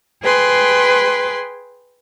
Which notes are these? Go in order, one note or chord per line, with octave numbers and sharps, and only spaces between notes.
G#4 B4 G5 C6